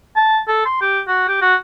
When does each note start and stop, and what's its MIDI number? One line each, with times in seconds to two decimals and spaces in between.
0.16 0.40 81
0.48 0.64 69
0.65 0.76 84
0.81 1.01 67
1.07 1.27 66
1.28 1.38 67
1.42 1.55 66